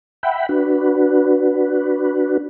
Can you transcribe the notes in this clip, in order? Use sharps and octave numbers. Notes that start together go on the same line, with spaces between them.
E5 F#5 G5 B5
D4 F#4 B4